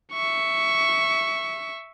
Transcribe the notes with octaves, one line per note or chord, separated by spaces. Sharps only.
E5 C#6